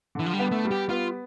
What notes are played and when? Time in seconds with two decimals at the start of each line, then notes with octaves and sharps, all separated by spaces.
0.15 D3 E3
0.26 F3
0.33 G3
0.39 B3
0.52 A3
0.65 G3
0.71 G4
0.89 B3 F4